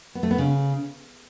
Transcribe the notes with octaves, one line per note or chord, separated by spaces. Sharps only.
B3
A3
B3
C#3